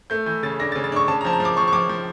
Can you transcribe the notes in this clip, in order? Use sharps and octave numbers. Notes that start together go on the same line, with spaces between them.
A3 G6
E3 G6
C#3 A6
D4 A#6
A6
C#3
A6
D4 C#6
C#3 A5
A#5
F3 A5
A#5
F3
D6
F3 C#6
C#6
F3 D6
F3